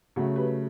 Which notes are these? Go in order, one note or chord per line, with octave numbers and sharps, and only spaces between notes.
C#3 F#3 A3 F#4
G4 B4